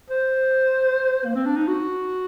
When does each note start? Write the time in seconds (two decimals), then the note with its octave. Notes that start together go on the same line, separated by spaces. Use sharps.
0.10 C5
1.25 A#3
1.35 C4
1.46 D4
1.56 D#4
1.67 F#4